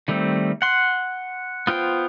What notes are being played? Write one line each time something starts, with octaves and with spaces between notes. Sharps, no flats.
D#3 G3 A3 C4
F#5 C6
B3 F4 C5 G5